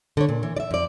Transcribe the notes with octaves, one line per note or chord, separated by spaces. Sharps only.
D3 C#5
A#2
E3
D5 E5
F2 D5